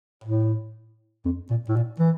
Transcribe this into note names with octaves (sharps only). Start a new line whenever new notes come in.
A2
F2
A#2
A2
A#2
E3